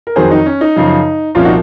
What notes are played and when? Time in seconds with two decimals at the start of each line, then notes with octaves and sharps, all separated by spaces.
0.07 A#4
0.16 F2 D#3 F#3 G#4 C5
0.31 D#4
0.46 C#4
0.61 D#4
0.76 F#2 C#3 F3
1.35 C2 A#2 F3 C#4 F4
1.45 D#4 F#4